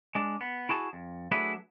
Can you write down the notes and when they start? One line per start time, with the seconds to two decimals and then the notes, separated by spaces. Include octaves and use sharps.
0.15 G#3 D4
0.41 B3
0.69 E4 F#4 G#4 A5
0.93 F2
1.31 F#3 A3 D4 E4 G#4 B4